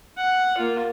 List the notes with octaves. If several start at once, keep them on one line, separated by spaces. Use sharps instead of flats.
F#5
A#3 F4